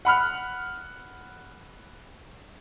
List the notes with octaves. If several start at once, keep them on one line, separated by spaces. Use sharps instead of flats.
F#5 B5 F6 F#6